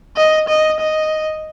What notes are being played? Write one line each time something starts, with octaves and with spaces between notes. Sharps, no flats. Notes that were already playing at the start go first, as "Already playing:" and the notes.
D#5
D#5
D#5